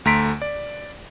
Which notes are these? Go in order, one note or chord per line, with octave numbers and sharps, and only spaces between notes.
D2 A3 A#5 C6 B6 D7
D5